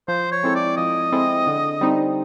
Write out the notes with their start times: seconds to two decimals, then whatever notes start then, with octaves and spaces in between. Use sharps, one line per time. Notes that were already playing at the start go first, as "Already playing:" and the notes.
0.08 F3 C5
0.32 C#5
0.43 G#3 C4 E4 A4
0.55 D5
0.77 F3 D#5
1.12 G#3 C4 E4 A4
1.47 D3
1.81 G3 C4 D#4